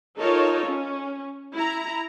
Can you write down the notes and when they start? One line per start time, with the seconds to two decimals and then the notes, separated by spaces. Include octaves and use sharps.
0.17 D#4 F4 A4 A#4 C#5
0.65 C#4
1.54 E4 A#5